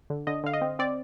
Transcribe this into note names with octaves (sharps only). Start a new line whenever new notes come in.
D3
D3 D#5
D3 F5
D#5
C4
C4 D5